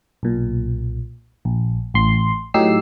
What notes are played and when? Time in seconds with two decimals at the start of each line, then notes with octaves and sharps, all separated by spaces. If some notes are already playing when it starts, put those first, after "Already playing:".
0.23 B1 A#2
1.45 A#1
1.94 A1 C6
2.54 A2 F#3 D#4 G4 E6 C7